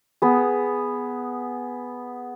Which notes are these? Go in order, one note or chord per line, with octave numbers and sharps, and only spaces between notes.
B3 G#4